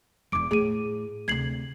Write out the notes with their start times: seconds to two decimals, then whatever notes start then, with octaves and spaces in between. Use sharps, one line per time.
0.32 E1 E2 D6 D7
0.51 A2 G#4 D#7
1.28 D2 C3 G#6 C7 F#7